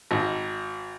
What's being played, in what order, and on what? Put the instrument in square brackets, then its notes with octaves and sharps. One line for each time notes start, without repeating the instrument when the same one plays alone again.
[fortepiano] G#1